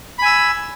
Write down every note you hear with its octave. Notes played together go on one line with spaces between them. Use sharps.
G#5 B5 E6